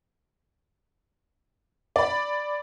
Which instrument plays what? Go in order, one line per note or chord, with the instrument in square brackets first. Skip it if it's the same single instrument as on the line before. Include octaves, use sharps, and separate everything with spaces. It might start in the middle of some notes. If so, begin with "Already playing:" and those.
[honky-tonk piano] D5 B5